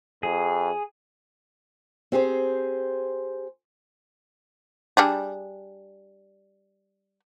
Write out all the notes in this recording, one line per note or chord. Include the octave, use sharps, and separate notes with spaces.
F2 G#4
C4 G4 G#4 C5
G3 D4 G#4